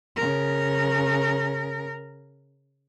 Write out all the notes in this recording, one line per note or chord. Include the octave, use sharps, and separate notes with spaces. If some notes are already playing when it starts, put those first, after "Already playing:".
C#3 A#4